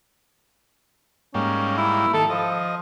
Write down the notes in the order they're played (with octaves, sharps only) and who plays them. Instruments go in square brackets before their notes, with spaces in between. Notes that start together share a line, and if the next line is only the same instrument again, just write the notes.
[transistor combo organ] G#2 G3 A#3 [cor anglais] C#4
[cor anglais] E4
[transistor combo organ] D#3 [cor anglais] A4
[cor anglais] F3 [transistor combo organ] D#5